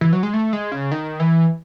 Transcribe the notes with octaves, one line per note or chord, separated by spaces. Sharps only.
E3
F#3
G#3
A3
G#3
C#3
D#3
E3